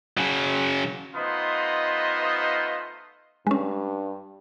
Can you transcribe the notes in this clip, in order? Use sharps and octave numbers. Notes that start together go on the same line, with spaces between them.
C#3 F#3
A3 B3 D#4 F4 C5 D#5
G2 G#3 C#4